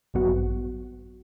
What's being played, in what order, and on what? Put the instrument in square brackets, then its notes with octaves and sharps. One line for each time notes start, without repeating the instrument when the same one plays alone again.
[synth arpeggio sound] A1 G2 F#3 B3 F#4